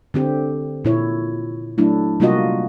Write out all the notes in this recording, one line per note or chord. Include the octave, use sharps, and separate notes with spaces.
D3 C4 G4
A#2 E4 C#5
F#3 A3 D4 E4
C3 G3 A#3 F4 F#4 D#5